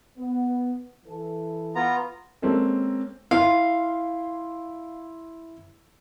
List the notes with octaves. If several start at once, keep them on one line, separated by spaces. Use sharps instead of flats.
B3
E3 A4
B3 F4 A#5
G#3 A#3 C4 C#4 A4
E4 F5 C6